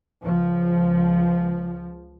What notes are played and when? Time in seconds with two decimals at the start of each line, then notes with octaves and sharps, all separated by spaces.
0.22 C#2 F3